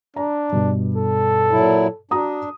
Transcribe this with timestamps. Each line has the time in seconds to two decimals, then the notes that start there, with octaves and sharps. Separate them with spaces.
0.16 D4 A#5
0.52 G2 B2
0.96 A4
1.51 A#2 F#3 E4
2.11 D4 F#4 A#5 D#6